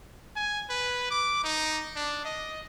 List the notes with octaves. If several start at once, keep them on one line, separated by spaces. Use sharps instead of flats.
G#5
B4
D6
D#4
D4
D#5